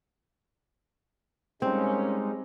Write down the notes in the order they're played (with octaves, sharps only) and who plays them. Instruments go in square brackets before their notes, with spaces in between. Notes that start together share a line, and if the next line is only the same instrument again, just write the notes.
[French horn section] A#2 C#4 [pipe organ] G3 G#3 D#4 [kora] C4